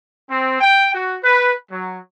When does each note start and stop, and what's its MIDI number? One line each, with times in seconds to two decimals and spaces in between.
0.30 0.60 60
0.61 0.92 79
0.94 1.16 66
1.23 1.52 71
1.71 1.97 54